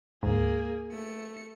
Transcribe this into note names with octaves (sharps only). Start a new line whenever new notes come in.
D2 G#2 A#3 G#4
A3 C#7